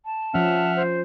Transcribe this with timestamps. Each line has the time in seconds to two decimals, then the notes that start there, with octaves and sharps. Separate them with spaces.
0.05 A5
0.34 F3 C#4 E5 F#5 F6
0.76 C5